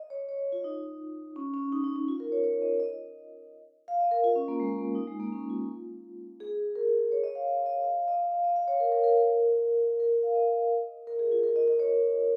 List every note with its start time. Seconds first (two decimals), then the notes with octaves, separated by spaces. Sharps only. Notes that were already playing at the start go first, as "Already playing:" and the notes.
Already playing: D#5
0.10 C#5
0.29 C#5
0.52 F4
0.64 D#4
1.36 C#4
1.54 C#4
1.72 D#4
1.84 D#4
1.96 D#4
2.08 F4
2.20 A#4
2.32 C#5
2.44 C#5
2.62 D#5
2.80 D#5
3.88 F5
4.01 D#5
4.11 A#4
4.24 F4
4.36 C#4
4.48 A#3
4.60 G#3
4.78 A#3
4.95 D#4
5.07 G#3
5.20 A#3
5.33 C#4
5.50 F4
6.40 G#4
6.75 A#4
7.12 C#5
7.24 D#5
7.35 F5
7.48 F5
7.66 D#5
7.84 F5
7.96 F5
8.08 D#5
8.32 F5
8.44 D#5
8.56 F5
8.68 C#5
8.80 A#4
8.92 A#4
9.04 A#4
9.16 A#4
10.00 A#4
10.23 F5
10.36 D#5
11.07 A#4
11.19 G#4
11.32 F4
11.43 A#4
11.56 D#5
11.68 D#5
11.79 C#5